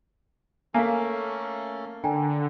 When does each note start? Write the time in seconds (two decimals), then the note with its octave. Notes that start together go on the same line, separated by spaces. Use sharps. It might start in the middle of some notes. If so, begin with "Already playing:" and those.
0.74 A3 A#3 C#4 A4 F5 G#5
2.04 D3 G5 G#5 A#5